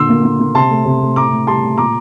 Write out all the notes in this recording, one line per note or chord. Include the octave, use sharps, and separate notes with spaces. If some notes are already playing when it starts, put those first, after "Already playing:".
Already playing: A#2 D3 C6 E6
A#3
A#3
A#3
C3 A5 C6
A3
C3
A3
A2 A#5 D6
A2
G3 A5 C6
A2
A#2 A#5 D6